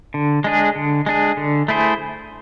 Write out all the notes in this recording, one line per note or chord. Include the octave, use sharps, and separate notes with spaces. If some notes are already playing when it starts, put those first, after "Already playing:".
D3
G#3 D4 G#4
D3
G#3 D4 G#4
D3
A3 E4 G#4 C5